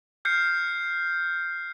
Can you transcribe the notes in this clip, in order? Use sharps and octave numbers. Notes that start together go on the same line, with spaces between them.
F6 G6 C7 C#7